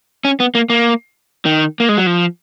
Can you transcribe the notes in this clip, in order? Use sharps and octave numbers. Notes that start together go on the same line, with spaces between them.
C#4
B3
A#3
A#3
D#3
A#3
G#3
F#3
F3